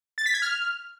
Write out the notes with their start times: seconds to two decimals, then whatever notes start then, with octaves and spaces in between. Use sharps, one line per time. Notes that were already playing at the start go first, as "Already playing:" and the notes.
0.18 A6
0.26 B6
0.34 G#6
0.42 F6